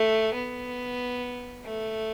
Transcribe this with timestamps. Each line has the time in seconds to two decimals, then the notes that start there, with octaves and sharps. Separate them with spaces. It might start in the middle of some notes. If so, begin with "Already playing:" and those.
Already playing: A3
0.34 B3
1.64 A3